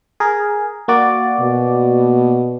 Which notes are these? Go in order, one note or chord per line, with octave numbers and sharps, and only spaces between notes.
G#4 A#4
A#3 F#4 D5
B2